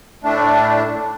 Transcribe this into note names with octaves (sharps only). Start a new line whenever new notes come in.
A2 A3 D4